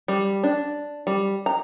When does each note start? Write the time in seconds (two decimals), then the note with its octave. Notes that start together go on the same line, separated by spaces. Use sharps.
0.08 G3
0.44 D4
1.07 G3
1.46 A#5